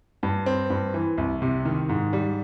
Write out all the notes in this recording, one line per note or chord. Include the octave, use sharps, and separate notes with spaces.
G2
C4
G2
E3
C2
C3
D#3
G#2
G3